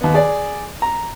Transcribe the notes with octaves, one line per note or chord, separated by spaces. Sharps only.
D#2 B3
G#4 D5
A#5